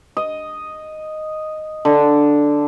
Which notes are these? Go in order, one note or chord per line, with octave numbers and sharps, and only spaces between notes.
D#5
D3